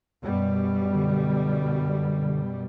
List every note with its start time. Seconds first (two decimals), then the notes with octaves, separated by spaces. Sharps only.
0.23 F#2 B2 G3
0.95 D3